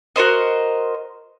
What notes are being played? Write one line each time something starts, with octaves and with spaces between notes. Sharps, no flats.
F#4 A#4 C5 D#5